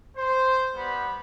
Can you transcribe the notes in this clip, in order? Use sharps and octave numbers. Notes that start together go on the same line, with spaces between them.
C5
G3 B3 B5